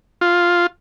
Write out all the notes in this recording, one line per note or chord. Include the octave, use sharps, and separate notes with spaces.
F4